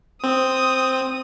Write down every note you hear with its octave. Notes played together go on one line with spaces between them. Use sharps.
C4 D#6